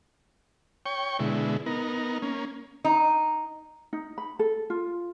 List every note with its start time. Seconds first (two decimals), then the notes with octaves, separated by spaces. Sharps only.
0.86 C#5 G5 C#6
1.19 B2 D3 G#3 E4
1.66 B3 D#4 A#4
2.22 A#3 C#4
2.85 D#4
3.93 D#4
4.18 B5
4.39 A4
4.70 F4